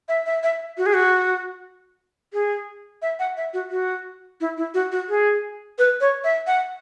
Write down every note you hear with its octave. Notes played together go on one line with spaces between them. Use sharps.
E5
E5
E5
F#4
G#4
F#4
G#4
E5
F#5
E5
F#4
F#4
E4
E4
F#4
F#4
G#4
B4
C#5
E5
F#5